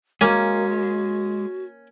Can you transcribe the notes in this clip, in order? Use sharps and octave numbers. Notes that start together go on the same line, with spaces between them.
G#3 A#3 C#4 F#4 G#5